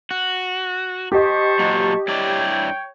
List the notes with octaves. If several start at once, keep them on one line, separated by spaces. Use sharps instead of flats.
F#4
G4 C5 D#5 A5 C#6
A#2 F#3
G2 E4 C#5 D5 G5